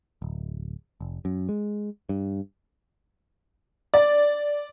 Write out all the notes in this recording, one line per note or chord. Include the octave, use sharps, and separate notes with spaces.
D1
F1
F#2
G#3
G2
D5